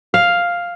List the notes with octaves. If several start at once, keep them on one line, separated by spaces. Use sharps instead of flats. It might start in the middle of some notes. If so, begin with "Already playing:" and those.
F5